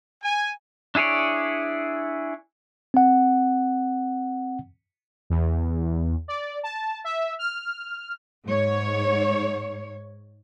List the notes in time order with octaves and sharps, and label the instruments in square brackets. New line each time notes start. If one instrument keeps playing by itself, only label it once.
[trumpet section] G#5
[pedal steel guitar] D4 E4 G#4 C#5 D5
[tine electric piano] C4 F#5
[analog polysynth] E2
D5
A5
E5
F6
[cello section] G#2 C#5